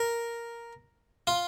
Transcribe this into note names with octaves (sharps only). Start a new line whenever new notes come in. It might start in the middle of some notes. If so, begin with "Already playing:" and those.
Already playing: A#4
F4